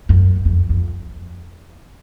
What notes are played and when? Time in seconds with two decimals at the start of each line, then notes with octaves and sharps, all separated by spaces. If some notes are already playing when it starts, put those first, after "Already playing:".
0.09 F#2
0.45 F2
0.69 F2